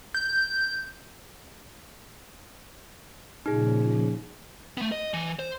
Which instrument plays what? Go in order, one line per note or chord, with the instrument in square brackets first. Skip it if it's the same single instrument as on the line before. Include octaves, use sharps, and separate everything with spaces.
[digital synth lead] G6
[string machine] A#2 C#3 F3 [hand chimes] D#4 G#4
[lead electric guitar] A3 B3
D#5
E3
C5